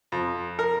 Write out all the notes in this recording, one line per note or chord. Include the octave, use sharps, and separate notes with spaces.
F2
A#4